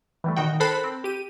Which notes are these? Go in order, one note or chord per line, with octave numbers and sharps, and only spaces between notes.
E3 G3 A3
A#2 D#3 D#4 F#4 G5
A4 A#4 C5 A5 B5 F#6
C4
G4 D#7